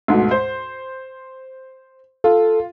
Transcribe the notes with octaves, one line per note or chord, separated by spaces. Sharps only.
D2 G#2 B2
C5
F4 A4